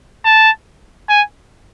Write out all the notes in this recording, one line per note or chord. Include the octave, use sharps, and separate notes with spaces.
A5
G#5